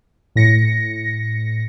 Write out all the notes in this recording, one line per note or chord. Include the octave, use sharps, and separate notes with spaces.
A2 A#6 C#7